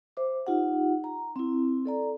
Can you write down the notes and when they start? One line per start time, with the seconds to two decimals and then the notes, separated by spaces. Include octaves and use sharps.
0.17 C5 E5 D6
0.47 D#4 F4 G4 F#5
1.04 A#5
1.36 C4 E4
1.85 A4 D5 A#5